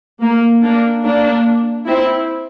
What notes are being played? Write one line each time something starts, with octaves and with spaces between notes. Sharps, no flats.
A#3
A#3 D4
A#3 D4
C4 E4